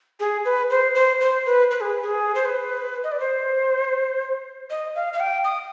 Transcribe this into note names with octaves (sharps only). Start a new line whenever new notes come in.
G#4
B4
C5
C5
C5
B4
B4
G#4
G#4
C5
B4
D#5
D5
C5
D#5
F5
F5
G5
D#6